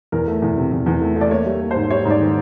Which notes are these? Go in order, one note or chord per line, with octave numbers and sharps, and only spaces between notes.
E2 A#4
A3
E2
C3
E2
E2
A3
A3
D5
A#3 C#5
G3
A#3
G#2 C5
G3 C#5
G#2
D5
D#3